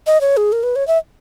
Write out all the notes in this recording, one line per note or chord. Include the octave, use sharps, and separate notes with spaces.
D#5
C#5
G#4
A#4
B4
C#5
E5